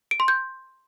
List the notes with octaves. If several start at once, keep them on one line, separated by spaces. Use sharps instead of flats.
D7
C6
G6